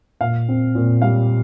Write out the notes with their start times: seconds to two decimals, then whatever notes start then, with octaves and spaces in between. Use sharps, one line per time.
0.20 A#2 F5
0.49 C4
0.75 A#2
1.02 G3 F5